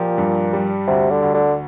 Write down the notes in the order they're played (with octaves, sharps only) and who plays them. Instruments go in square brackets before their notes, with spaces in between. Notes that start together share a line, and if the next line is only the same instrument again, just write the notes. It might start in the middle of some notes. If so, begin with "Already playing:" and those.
Already playing: [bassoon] A#2 [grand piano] F3 G4
[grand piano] G2
G3
[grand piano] D2 [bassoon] C3
[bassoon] D3
[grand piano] D2
[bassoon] D3